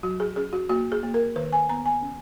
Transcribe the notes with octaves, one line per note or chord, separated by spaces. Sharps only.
F#3 F#4
G#4
C#4 G#4
F#4
A#3 F#4
G#4
A#3
A#4
D#3 B4
G#5
B3 A#5
G#5
C#4